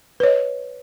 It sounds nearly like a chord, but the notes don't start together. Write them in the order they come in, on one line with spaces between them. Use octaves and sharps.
B4 C#5 D#5